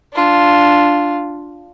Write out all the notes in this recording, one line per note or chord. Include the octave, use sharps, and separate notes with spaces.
D4 F4